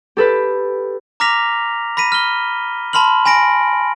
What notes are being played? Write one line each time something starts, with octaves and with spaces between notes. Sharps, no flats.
G4 A4 B4
A#5 D6 F6 A#6 B6 F7
B5 A#6 B6 D#7
F6 G7
A5 B5 C6 F6 F#7
G#5 B5 A#6 D7